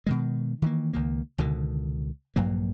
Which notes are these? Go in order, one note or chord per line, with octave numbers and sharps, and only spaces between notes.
B2 D#3 G#3
D#3 E3 A#3
C#2 D#3 A#3
C#2 B2 D3 D#3
A#1 G2 F#3 A#3